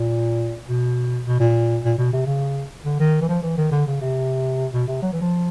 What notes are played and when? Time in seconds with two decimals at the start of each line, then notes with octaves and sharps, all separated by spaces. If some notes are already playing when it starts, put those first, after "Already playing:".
Already playing: A#2
0.68 B2
1.26 B2
1.40 A#2
1.84 A#2
1.99 B2
2.13 C3
2.27 C#3
2.85 D3
3.00 D#3
3.21 E3
3.29 F3
3.43 E3
3.58 D#3
3.72 D3
3.87 C#3
4.01 C3
4.73 B2
4.88 C3
5.02 F#3
5.12 E3
5.21 F3